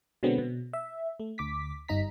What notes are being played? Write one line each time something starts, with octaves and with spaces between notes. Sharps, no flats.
B2 D3 F#3 G#3 B3 C4
B2
E5
A3
D2 D6 B6
G1 G3 D#4 A#5 B6